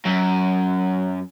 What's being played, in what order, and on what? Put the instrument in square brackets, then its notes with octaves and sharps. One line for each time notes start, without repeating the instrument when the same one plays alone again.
[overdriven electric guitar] F#2